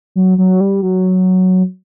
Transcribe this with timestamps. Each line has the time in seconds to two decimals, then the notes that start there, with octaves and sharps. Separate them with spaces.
0.15 F#3
0.38 F#3
0.60 G3
0.83 F#3